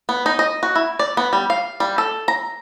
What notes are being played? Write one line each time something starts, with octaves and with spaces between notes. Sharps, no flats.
B3
D#4
D#5
F#4
E4
D5
B3
G3
F5
G3
A4
A#5